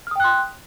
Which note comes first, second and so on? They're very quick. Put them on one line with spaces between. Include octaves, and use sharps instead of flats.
F6 D#6 G5 F#6 C6